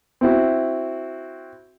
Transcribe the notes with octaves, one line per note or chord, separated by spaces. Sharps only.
C4 E4 F#4